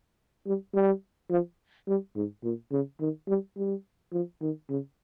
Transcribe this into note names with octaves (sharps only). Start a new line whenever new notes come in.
G3
G3
F3
G3
G#2
A#2
C#3
D#3
G3
G3
F3
D#3
C#3